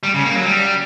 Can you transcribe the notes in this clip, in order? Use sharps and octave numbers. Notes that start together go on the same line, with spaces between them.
G3
C#3
A#3
F#3
G3